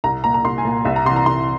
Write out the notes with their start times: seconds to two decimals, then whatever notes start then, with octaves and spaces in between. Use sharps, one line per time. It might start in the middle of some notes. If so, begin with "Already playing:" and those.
0.04 C2 A#5
0.24 A#2 A#5
0.34 A#5
0.45 C2 C6
0.58 G#5
0.65 A#2
0.85 C2 E5
0.96 A#5
1.05 C3 C6
1.10 E3
1.16 A#5
1.26 C2 C6